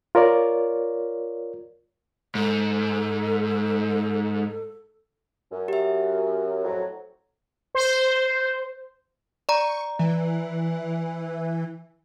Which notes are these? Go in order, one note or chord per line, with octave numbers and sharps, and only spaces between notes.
F4 A#4 C#5 D5
G#2 A4
F#2
G4 E5
F2 A2 F#3
C5
D5 A#5 C#6
E3